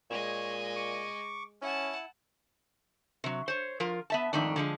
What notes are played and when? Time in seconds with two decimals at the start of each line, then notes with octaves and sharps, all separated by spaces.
0.10 A#2 G#3 C#5 D#5
0.76 C#6 D6
1.62 C#4 E4 F#5 A5
3.24 C3 F#3
3.48 C5 C#5
3.80 F3 F4 A#4
4.10 B3 E5 A5
4.33 F2 G#2 D#3 A3 D4
4.56 D3 F3 G#3